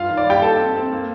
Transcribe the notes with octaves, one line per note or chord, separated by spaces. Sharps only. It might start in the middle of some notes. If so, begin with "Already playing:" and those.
Already playing: G2 F4 F5
D#3
D5
G2 G4 G5
D#4 A4 A5
C4
C4
A#3